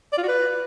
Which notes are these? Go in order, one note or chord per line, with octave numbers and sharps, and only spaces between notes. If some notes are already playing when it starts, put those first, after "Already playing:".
D5
F4
F#4
B4